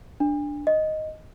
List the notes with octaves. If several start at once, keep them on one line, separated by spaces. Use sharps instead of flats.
D4
D#5